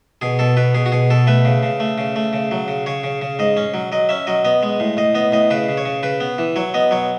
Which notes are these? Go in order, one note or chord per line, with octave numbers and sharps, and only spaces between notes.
B2 G#4
B2 A4
B2 B4
B2 G#4
F#4
B2 G#4
B2 A4
A3 B4
C#3
C#3
A3
C#3
A3
C#3
F#3
C#3
C#3 C#5
C#3
C#3
G#2 D#5
C#4
F#3
F#3 D#5
C#4 E5
F#3 D#5
B3 D#5
G#3
A2
A2 D#5
B3 D#5
A2 D#5
C#3 B4
C#3
C#5
C#3
C#3 B4
B3
E3
F#3 C#5
B3 D#5
F#3 C#5